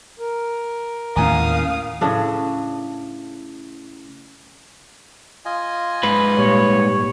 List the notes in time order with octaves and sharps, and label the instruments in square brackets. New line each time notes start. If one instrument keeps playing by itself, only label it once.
[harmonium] A#4
[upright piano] G#1 G#5 A#5 [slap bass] D#2 A2 C#4 [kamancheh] F5 D#6
[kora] A2 C#3 D4 A4
[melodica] F4 D#5 G#5
[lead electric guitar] G#2 B4
[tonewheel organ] A#2 G3 [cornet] C#5